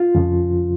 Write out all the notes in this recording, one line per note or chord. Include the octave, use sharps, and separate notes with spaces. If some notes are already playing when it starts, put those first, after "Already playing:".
Already playing: F4
F2 C#3 F3